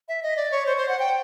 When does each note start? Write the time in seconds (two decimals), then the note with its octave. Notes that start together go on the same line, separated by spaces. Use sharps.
0.08 E5
0.23 D#5
0.37 D5
0.52 C#5
0.66 C5
0.77 C5
0.88 F#5
0.99 G5